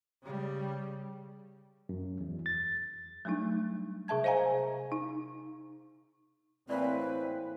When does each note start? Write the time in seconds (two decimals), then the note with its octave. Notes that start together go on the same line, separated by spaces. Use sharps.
0.23 C#3 G3
1.89 F#2
2.21 E2
2.46 A6
3.25 F#3 G3 A3 D4 D#4
4.08 C3 G#4 E5 A5 G#6
4.24 C5 D#5 F5 G#5 A#5
4.92 D#4
6.69 A2 E3 A#3 C4 A4 B4 D5